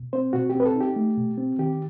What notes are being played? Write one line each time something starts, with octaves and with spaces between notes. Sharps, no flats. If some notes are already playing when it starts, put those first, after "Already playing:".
Already playing: B2
C4 C5
B2 F#4
G4
C4
B4
A4
D#4
G4
A3
B2
C4
D#3 G4